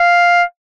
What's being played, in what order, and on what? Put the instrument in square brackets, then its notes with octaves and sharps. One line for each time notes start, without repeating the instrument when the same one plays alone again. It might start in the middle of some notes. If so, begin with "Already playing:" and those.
Already playing: [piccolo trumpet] F5